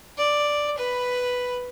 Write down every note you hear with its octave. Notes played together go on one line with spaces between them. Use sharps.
D5
B4 B5